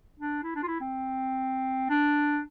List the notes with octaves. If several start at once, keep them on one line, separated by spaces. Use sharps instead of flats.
D4
E4
D4
F4
E4
C4
D4